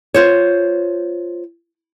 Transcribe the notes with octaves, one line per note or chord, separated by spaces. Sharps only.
F4 C5 C#5